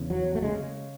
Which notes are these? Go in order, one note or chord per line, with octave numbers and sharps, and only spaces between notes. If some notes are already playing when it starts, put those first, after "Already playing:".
Already playing: E2 C#3
F#3
A3
C#3 G#3